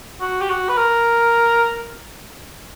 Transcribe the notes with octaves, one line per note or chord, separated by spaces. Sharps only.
F#4
G4
F#4
B4
A#4